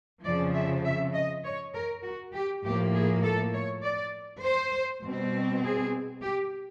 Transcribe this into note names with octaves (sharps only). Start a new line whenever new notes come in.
F2 C#3 F3 D5
E5
E5
D#5
C#5
A#4
F#4
G4
A2 F3 A#3 G4
G#4
A4
C#5
D5
C5
B2 G3 C4
G#4
G4